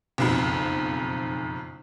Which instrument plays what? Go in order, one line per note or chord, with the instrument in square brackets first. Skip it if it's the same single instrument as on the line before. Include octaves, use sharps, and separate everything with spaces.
[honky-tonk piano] F#1 B1 F2